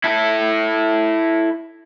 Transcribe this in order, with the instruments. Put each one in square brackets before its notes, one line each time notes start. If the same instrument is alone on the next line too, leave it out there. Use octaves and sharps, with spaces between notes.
[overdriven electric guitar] E4 A4